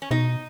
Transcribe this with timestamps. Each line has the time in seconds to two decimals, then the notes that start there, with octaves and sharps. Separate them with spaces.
0.02 C#4
0.11 B2 D#4